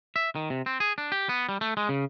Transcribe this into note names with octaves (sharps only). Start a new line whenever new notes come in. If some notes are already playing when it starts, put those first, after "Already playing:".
E5
D#3
C3
C4
G#4
D4
G4
B3
G3
A3
G#3
C#3